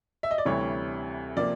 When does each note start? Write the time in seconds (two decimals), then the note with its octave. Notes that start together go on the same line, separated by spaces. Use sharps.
0.23 E5
0.31 D#5
0.38 D5
0.45 D2 C3 E3 G3 C#5
1.37 C3 F3 A#3 D5